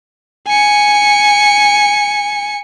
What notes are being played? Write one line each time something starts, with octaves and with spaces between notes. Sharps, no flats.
G#5 C#7